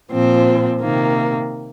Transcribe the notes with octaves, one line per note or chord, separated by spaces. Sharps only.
A#2 F3 C4
C3 D#3 A#3